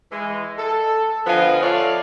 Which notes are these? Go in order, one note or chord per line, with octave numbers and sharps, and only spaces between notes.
E3 G#3
A4
D3 F3 B3 F4 D#5 G#5
A4 C#5 D5 E5 F5